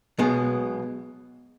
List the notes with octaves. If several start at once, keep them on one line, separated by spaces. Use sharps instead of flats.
B1 B2 G#3 B3